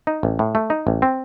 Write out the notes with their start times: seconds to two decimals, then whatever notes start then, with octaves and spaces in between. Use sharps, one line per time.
0.07 D#4
0.23 A1
0.39 A2
0.55 A3
0.70 D#4
0.87 A1
1.02 C4